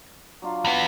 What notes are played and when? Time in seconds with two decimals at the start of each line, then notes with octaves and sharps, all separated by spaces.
0.42 F#3 D4 F4
0.65 E2 B3